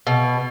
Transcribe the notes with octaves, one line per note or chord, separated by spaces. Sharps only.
B2